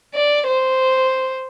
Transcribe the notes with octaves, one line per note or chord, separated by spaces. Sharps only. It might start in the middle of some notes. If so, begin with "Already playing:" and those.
D5
C5